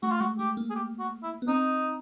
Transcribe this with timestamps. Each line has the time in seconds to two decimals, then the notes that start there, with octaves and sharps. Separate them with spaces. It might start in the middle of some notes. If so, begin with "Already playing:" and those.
0.03 A3 F#4
0.12 F4
0.20 G#3 F#4
0.39 A3 G4
0.57 A#3
0.70 G#4
0.75 G4
0.99 F#4
1.23 E4
1.42 B3
1.48 C4 D#4